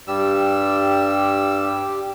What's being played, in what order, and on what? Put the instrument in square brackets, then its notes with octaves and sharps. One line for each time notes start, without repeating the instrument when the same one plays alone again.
[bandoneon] G2 G3 E6 [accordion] G4